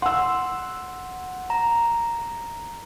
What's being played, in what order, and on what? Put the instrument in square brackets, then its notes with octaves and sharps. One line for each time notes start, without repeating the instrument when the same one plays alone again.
[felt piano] F#5 E6 [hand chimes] C6
[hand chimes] A#5